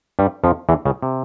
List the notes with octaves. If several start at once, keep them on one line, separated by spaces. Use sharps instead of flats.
G2 G3
F2 F3
E2 E3
C#2 C#3
C3